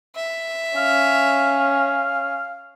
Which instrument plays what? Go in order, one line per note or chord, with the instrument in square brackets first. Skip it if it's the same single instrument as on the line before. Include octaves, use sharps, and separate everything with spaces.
[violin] E5
[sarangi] C#4 [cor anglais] F5